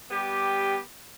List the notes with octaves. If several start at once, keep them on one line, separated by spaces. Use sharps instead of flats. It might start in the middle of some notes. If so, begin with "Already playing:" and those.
G3 B3 G4